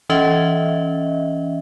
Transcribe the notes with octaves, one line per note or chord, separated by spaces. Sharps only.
E3 C#4 D#5 E5